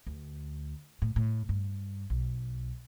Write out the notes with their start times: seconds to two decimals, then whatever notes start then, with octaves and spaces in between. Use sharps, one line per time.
0.07 D2
1.02 A2
1.16 A2
1.49 G2
2.10 B1